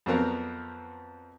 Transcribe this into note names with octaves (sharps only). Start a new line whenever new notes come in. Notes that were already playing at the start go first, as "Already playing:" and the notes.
F2 F#3 B3 C4 A#4 F5